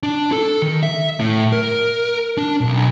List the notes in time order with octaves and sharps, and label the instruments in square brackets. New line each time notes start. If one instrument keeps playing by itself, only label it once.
[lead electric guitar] D4
A4
D#3
E5
A2
A#4
D4
B1